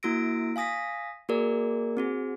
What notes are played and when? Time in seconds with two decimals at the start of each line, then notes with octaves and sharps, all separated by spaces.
0.03 A#3 E4 F#4 E6 A#6 D7
0.56 F5 G#5 D#6 A#6 B6
1.29 A#3 F#4 G#4 A#4 D5
1.97 C4 F#4 G#4